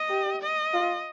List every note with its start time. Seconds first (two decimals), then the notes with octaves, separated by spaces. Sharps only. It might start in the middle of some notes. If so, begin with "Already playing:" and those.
Already playing: D#5
0.09 G4
0.41 D#5
0.74 F4